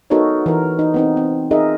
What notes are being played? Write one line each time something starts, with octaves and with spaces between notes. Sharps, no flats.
B3 D#4 F#4 A4 A#4 C#5
E3 A#4
D#4
B3 C4 D#4
C4
D#4 F4 G#4 A#4 D#5 E5